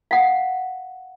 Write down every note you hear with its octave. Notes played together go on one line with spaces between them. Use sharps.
F5 F#5